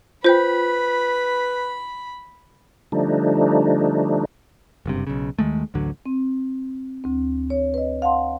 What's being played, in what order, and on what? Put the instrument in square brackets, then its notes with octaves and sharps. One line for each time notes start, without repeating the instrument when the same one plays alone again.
[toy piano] F4 G5 [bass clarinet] B4 [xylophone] C5 G6 [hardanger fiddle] B5
[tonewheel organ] D3 F3 G3 A3 D4 D#4
[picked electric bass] F#1 G2 C3
B1 C#3
D#2 D#3 G#3 A3
A1 D2 D3 F#3
[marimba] C4
D2 C4
C#5
B4 D#5
F5 F#5 A5 C6